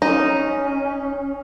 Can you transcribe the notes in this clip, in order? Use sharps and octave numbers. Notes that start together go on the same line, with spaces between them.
C#4 D#4